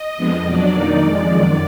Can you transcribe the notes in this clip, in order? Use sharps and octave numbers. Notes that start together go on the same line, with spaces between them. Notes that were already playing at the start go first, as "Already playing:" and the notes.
Already playing: D#5
F2 F3 G#3 B3 D4
B2 F#3 D4 D5
F2 D#3 A#3 D#4
F2 F3 G#3
F#2 D#3 F#3